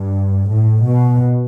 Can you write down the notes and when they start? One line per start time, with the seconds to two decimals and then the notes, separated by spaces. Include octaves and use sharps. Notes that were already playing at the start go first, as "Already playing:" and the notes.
Already playing: G2
0.49 A2
0.86 B2